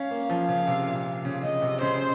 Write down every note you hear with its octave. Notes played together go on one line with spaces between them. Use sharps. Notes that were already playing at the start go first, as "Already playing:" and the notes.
Already playing: C#4 F5
A#3
F3
C#3
C3
A#2
C#3
C#3 D#5
C3
C#3 C5